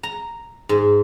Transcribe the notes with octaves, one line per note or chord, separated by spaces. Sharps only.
A#5
G#2